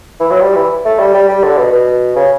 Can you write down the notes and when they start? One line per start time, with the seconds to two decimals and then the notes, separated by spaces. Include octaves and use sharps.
0.20 E3
0.31 F#3
0.41 G3
0.55 E3
0.85 A3
1.00 G3
1.14 G3
1.29 G3
1.44 D3
1.58 B2
1.72 B2
2.16 C#3